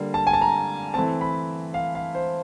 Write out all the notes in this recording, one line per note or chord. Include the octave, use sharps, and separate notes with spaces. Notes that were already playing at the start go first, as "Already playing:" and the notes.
Already playing: D3 G3 A#3
A5
G#5
A5
A#5
E3 A3 C4 A5
B5
F5
F5
C5